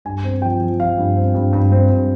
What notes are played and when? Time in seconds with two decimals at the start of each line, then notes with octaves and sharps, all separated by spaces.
0.05 G2 G#5
0.24 C4
0.42 F3 G5
0.60 F3
0.80 F3 F5
0.98 G2
1.16 C4
1.35 G2
1.53 G2
1.72 C4
1.90 G2